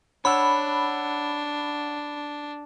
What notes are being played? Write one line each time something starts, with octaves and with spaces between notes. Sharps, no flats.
D4 C#5 F#5 B5 E6